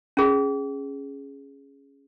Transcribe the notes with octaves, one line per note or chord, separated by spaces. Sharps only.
C#4 G#4